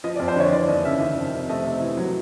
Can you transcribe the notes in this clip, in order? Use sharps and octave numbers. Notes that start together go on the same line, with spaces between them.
F3 D#5
D5
F2
C5
D3 C#5
E3 D5
D#2 D#5
C#3 E5
D#3 E5
F2
C3
A3 D#5
C3
E3
F#3